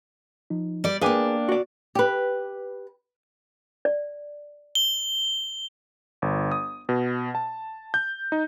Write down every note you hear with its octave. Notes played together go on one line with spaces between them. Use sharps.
F3 D#4
G3 D5
A#3 D4 G#4 B4 F5 G5 G#5 D6
F#4 D5
G4 B4
D5
G7
G1
D#6
B2
A5
G6
D#4